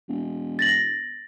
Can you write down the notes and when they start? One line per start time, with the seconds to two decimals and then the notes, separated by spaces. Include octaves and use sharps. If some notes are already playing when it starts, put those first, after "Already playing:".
0.09 E1
0.59 A6 A#6 F#7